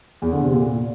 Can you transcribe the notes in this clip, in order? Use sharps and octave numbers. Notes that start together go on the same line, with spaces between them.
E2
D3
C3
A#2